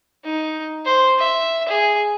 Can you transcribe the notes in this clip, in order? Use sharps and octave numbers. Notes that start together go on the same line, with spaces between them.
D#4
C5
E5
G#4